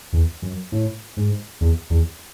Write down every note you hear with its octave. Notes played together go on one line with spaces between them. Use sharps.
E2
F#2
A2
G#2
E2
E2